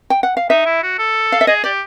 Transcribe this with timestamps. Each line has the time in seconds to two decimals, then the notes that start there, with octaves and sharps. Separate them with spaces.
0.10 G5
0.23 F#5
0.37 F5
0.50 D#4 E5
0.66 E4
0.83 F#4
0.98 A4
1.32 F5
1.41 E5
1.47 G#4 D#5
1.64 G4 D5